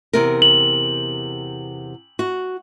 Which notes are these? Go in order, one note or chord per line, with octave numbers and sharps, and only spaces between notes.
E2 C3 A#4
F#7
F#4